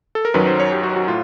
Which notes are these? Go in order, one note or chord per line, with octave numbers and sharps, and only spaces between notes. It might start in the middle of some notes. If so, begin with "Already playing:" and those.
A4
A#4
F#2 D#3 F#3 B4
C5
C#5
G4
F#4
F#4
A2 F4